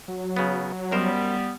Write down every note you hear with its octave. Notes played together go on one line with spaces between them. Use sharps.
F#3
C#3 B3
F#2 G3 B3 A#4 C5